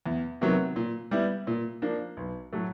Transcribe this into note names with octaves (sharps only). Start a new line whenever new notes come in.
E2
C3 D#3 F#3 B3
A#2
G3 B3 E4
A#2
F3 A#3 D4
B1
A2 F#3 A3